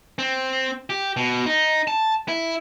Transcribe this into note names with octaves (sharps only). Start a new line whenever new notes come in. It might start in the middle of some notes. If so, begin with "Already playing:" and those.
C4
G4
B2
D#4
A5
E4